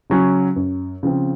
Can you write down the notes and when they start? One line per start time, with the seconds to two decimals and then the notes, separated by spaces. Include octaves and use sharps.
0.10 C#3 F#3 C#4
0.56 F#2
1.03 C#3 F3 C4